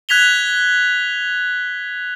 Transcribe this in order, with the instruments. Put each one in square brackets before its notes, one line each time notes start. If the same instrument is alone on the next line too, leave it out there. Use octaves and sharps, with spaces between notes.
[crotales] F#6 G#6 B6 F7 G7